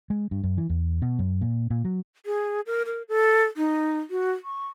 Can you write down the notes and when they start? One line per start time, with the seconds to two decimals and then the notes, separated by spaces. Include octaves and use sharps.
0.10 G#3
0.31 G2
0.44 F#2
0.58 E3
0.70 E2
1.02 B2
1.19 F#2
1.41 A#2
1.70 A#2
1.85 F#3
2.26 G#4
2.67 A#4
2.86 A#4
3.09 A4
3.57 D#4
4.10 F#4
4.45 C#6